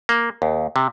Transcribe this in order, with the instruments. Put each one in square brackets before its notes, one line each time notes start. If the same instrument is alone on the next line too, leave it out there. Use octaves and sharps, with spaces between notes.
[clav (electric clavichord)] A#3
D#2
C3